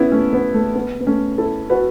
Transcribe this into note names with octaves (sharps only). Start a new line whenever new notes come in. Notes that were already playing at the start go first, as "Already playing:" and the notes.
Already playing: B3 C#4 E4
A3 C#4
B3
A3
B3
B3
A3 C#4
E4 A4
F#4 B4